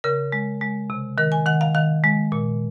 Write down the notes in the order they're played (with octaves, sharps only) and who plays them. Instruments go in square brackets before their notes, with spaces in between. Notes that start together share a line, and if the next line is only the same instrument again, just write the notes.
[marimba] C#3 A#4
G#3
G#3
C3
D#3 A#4
G#5
D#3 F#5
F5
D#3 F5
G#3
A#2